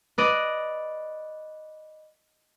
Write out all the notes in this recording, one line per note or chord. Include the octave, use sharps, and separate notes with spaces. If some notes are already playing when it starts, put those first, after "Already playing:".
B4 D5 D#5